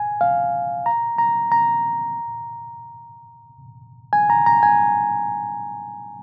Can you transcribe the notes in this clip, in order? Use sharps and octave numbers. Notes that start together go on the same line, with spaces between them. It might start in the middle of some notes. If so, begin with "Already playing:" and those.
Already playing: G#5
F5
A#5
A#5
A#5
G#5
A#5
A#5
G#5